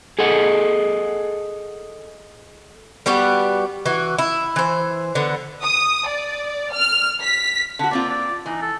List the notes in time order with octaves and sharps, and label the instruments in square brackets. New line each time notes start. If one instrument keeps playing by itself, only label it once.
[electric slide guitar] G#4 A4 D#5 F#5
[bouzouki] G3 B3 F#4 G4
E3 F#4
E4
E3 C5
D3 B3
[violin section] D#6
D5
F6
B6
[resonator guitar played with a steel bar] D3 F#4
[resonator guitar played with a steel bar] A#3 C4 F4 [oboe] D5
[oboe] D5
[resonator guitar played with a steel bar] E3 [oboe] D#4
[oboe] A4